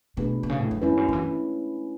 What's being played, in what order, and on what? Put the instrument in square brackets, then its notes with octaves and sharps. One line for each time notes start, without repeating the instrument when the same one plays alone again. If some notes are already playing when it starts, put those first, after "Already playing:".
[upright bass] B2 [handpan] A3 D4 G#4 B4
[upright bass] B2
C#3
A2
F#2
[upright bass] E2 [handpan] G#3 C#4 E4 B4
[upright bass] F#2
D3
E3